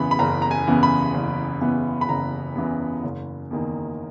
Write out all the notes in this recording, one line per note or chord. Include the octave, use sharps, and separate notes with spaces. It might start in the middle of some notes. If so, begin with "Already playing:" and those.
Already playing: F#1 E2 C#3 E3 B3 B5
B5
F#1 A#5
A#5
G#5
E2 C#3 E3 B3
B5
F#1
E2 C#3 E3 B3
B5
F#1 A#5
E2 C#3 E3 B3
F#1
E2 D#3 A#3